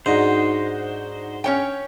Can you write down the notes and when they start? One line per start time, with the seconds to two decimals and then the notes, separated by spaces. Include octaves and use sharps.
0.06 G#2 D4 D#4 F#4 C5
1.44 C#4 C#5 G5